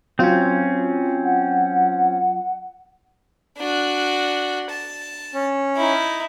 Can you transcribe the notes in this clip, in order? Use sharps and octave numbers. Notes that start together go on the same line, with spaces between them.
F#3 C4 C#4 F4
F#5
D4 F#4
A5
C#4
D#4 E4